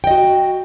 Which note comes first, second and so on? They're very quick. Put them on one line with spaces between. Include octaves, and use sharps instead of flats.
G5 D#5 F#4